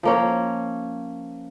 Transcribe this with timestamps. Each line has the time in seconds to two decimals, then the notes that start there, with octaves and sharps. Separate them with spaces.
0.03 F3 A#3 C#4